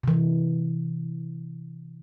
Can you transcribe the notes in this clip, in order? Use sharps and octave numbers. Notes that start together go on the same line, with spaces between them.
C3 E3